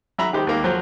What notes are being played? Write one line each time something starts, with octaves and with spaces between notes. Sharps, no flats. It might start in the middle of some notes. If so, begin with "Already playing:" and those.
F#3 E5 A#5 B5
D#3 G4 C5
D#2 A#3
F3 F#3 C5